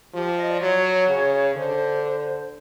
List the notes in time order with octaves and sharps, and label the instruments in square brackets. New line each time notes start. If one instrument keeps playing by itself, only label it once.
[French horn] F3 [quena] G4
[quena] D#5
D5
[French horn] F#3 [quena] C#5
[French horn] C#3
[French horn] D3 [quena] C5